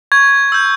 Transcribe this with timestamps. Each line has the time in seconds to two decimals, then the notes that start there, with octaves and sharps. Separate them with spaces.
0.12 C#6 G#6
0.52 E6 G6